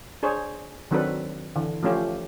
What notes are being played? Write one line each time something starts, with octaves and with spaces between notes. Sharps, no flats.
D4 G#4 C5 C#5
D#3 F#3 C4 D4 A4 B4
D3 E3
F3 A3 C#4 F4 G4